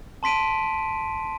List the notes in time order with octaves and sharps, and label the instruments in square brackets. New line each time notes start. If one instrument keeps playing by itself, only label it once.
[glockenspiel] A5 C6 B6 D7 D#7